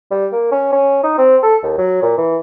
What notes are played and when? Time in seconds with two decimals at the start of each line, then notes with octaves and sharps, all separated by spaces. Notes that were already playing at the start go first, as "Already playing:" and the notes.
0.11 G3
0.32 A#3
0.52 C#4
0.73 C#4
1.03 D#4
1.18 C4
1.43 A4
1.63 D#2
1.78 F#3
2.03 A#2
2.18 E3